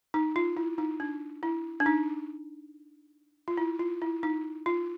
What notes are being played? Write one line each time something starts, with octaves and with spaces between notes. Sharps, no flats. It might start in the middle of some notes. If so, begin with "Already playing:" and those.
D#4
F4
E4
D#4
D4
E4
D4
D#4
F4
E4
F4
E4
D#4
F4